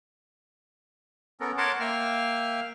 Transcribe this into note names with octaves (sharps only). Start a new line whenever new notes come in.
B3 C#4 A4 A#4
A#4 C#5 F#5 A5 C6 D6
A#3 E5 F5 G5 F6